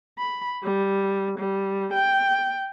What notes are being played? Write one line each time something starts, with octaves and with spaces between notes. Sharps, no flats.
B5
G3
G3
G5